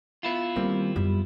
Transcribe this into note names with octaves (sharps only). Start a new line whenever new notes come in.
B3 E4 F4
D#3 G3 A#3 C4
F#2 G3